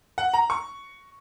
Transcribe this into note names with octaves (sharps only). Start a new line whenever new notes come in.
F#5
A#5
C#6